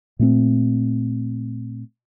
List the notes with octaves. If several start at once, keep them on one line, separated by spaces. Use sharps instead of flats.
A#2 A3 C4